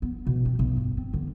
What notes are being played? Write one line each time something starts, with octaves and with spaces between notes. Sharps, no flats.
B3
B2
C4
B1
G2
C4
D3